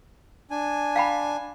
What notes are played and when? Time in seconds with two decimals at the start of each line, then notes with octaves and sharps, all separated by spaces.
0.51 D4 G#5
0.96 F5 G5 B5